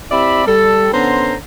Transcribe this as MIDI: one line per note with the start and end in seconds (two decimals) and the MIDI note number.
0.10 0.44 60
0.10 0.44 64
0.10 0.44 67
0.10 0.44 74
0.10 0.44 76
0.10 0.44 83
0.46 0.91 55
0.46 0.91 69
0.92 1.36 50
0.92 1.36 59
0.92 1.36 61
0.92 1.36 72
0.92 1.36 82
0.92 1.36 84